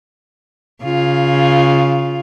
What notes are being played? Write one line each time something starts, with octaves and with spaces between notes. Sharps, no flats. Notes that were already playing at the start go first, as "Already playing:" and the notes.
C#3 F4